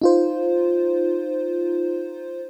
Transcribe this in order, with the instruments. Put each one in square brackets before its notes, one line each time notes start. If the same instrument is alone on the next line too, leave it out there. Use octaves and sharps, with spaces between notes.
[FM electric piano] D#4 F4 C5